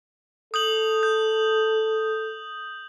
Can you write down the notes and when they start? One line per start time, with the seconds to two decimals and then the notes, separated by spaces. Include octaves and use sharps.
0.54 A4 D#6 G6 F#7
1.03 G6